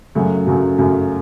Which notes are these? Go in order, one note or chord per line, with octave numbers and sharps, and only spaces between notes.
F#2 C#3 F#3 A3
F#2 C#3 F#3 A3
F#2 C#3 F#3 A3